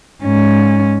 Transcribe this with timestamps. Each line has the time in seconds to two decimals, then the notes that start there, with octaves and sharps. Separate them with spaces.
0.23 G#2 C#4